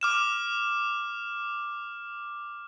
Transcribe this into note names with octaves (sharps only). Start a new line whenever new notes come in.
D6 F6 E7